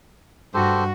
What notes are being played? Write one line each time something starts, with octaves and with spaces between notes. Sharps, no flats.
G2 F#4 G4 A4 C5